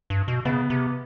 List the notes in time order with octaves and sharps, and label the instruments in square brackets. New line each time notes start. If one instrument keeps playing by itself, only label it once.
[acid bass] G2
B2
[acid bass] C#3 [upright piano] B3
[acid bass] C3